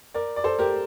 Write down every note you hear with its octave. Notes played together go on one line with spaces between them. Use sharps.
A#4 D5
D5
A4 C5
G4 A#4